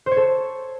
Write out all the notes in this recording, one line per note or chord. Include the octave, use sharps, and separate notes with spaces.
C5
C#5
A4